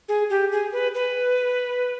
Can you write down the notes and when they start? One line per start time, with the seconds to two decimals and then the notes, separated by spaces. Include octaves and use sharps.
0.09 G#4
0.30 G4
0.52 G#4
0.73 B4
0.95 B4